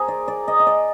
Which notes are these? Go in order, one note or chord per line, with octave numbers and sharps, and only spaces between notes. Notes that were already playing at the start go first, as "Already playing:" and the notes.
Already playing: G#4 A#4 C5
D5
D5
D#5
D#5
D5